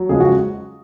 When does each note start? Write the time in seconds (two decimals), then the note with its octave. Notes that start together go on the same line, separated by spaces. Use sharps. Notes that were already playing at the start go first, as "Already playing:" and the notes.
Already playing: F#3
0.09 C#3 F3 G#3 G#4
0.20 F#4